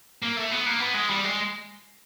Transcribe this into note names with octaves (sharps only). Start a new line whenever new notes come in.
A#3
A3
B3
A#3
B3
G#3
G3
G#3